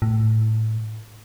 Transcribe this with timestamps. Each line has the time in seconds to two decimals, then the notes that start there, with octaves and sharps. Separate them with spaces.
0.02 A2